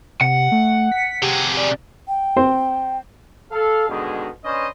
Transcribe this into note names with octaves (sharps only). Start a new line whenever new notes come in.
C3 F#5
A3
B6
C3 G4 G#4
D5
G5
C4 C5
A4 F5
G#2 B2 D3 D#3 G#3 G#4
C#4 D4 B4 C5 D#5